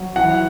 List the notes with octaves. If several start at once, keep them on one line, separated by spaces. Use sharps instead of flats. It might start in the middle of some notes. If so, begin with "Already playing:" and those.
Already playing: F#3
E3 F#5